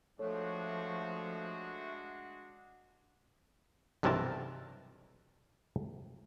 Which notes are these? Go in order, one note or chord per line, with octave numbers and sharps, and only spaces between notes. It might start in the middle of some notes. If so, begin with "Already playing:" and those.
F3 G#3 A3 D4 F#4 A4 C#5
B1 G2 C3 E3 A#4 A5